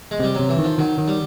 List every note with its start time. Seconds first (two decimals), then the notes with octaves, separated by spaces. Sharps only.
0.11 G#3
0.20 C3 G3
0.35 C3 F#3
0.49 E3
0.58 D#3
0.64 F3
0.78 D#3 F#3
0.98 D#3
1.08 G3